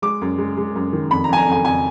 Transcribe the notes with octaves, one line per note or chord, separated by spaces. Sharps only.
G#3 D6
F#2
G#3
G#3
F#2
D#3
F2 B5
A#5
F2 G#5
A#5
F2
G#5
F2 G#5